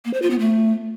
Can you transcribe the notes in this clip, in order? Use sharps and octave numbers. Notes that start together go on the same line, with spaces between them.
A#3
C5
F4
B3
A3